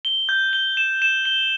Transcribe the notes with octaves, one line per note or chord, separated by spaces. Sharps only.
G7
G6
G7
E7
E7
G7